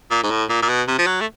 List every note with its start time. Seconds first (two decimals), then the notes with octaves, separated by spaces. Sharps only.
0.11 A#2
0.23 G#2
0.31 A2
0.49 A#2
0.62 A#2
0.69 B2
0.87 C3
0.98 F3
1.06 F#3
1.21 A3